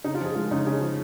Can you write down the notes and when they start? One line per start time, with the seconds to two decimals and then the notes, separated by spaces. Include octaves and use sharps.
0.04 C#3 D#4
0.14 F4
0.20 F3 G#4
0.35 G#3 F4
0.51 C#3 D#4
0.66 C#3 G#4
0.81 F3